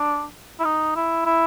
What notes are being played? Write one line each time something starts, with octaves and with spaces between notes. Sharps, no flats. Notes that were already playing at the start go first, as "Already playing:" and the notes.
Already playing: D4
E4
D#4
E4
E4